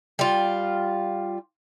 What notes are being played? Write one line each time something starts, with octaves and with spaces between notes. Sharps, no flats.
G3 F4